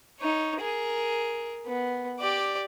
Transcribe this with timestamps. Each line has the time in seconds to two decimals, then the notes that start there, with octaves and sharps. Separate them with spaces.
0.20 D#4 C#5
0.60 G#4 A#4
1.67 B3
2.19 G4 D5